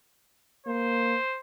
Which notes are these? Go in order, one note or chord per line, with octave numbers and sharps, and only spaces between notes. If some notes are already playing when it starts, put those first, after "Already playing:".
A#3 C5